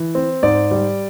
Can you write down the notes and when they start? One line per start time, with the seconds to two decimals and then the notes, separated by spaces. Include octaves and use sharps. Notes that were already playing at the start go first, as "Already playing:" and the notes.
Already playing: E3
0.15 C4
0.43 G#2 D5
0.71 G3